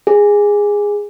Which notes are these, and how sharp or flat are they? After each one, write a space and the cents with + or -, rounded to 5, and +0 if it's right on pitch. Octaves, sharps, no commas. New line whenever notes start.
G#4 -10